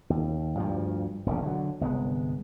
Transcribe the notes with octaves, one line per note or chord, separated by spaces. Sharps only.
D#2
D2 G2 F3
E1 A#1 C#3
D3 F#3
G1 C2 G#3 B3